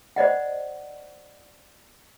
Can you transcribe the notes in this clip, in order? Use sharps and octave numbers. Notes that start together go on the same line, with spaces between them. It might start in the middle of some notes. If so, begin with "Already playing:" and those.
C5 D5 D#5 F#5